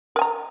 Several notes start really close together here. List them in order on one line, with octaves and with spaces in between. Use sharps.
A#4 G#5 A#5